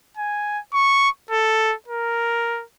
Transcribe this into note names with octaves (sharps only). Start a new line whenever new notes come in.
G#5
C#6
A4
A#4